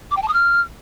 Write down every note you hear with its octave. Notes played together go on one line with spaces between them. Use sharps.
D6
G5
A5
D#6
F6